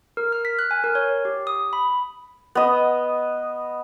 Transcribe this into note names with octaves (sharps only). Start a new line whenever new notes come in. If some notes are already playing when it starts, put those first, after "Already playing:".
A#4
F6
B6
F#6
G#5
A#4
C#5
G4
D#6
B5
B3 D#5